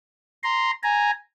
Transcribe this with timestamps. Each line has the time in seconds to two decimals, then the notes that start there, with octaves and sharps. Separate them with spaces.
0.43 A#5 C6
0.83 G#5 A#5